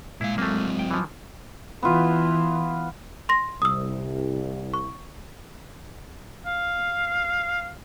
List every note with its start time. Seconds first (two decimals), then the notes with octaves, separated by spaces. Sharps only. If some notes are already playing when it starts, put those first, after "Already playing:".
0.21 A#2 G#3 E4 F5
0.38 F#3 A3 A#3 C4
0.79 G5
0.91 E3 F3
1.83 E3 B3 F4
3.29 C6 A#6
3.62 C2 D#6 E6
4.74 C#6
6.46 F5